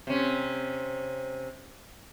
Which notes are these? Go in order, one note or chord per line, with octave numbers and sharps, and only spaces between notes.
C3 C#4